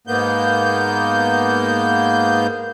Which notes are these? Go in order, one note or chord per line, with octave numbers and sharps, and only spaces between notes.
G#2 A#3 B3 G6